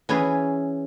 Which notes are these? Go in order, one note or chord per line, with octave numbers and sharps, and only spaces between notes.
E3 C#4 E4 G#4 B4